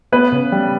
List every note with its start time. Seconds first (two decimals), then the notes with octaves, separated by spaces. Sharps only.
0.12 B3 B4
0.32 C#3
0.52 G3